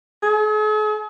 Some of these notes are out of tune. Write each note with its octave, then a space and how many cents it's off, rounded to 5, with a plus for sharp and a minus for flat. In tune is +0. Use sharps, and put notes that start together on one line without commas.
G#4 +45